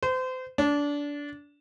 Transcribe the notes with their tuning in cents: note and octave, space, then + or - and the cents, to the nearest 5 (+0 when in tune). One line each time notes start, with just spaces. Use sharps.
C5 -30
D4 -20